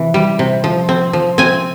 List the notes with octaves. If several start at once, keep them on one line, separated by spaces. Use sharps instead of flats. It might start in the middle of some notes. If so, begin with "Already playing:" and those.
Already playing: C3 E3
G3
C3
F3
C4
F3
C4 G#5